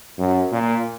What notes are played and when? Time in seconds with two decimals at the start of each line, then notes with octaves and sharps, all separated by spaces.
0.18 F#2
0.52 A#2